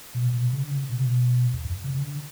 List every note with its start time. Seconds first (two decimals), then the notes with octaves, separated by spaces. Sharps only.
0.14 B2
0.33 B2
0.53 C#3
0.63 D3
0.71 C#3
0.90 B2
0.96 C#3
1.04 B2
1.53 E2
1.65 F#2
1.84 C#3
1.94 C#3
2.02 D3